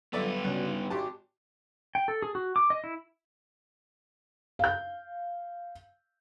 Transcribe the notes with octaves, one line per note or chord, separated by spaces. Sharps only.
G2 F#3 B3 F4 A4 D5 E5
C#2 F#4 D5
D#4
G#1 F#4 G4 A5 D6
G5
A4
G#4
F#4
D6
D#5
E4
F5 G6